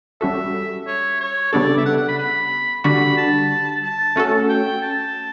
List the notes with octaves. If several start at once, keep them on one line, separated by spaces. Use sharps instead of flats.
G3 C#4 F#4 A4 E5
C#5
C#5
C#3 G3 B3 D4 A4 D5
E5
F#5
F#5
B5
B5
D3 G3 D4 F#4 B5
A5
A5
A3 C#4 F#4 A4
G5
A5